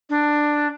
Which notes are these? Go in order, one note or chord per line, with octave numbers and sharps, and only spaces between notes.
D4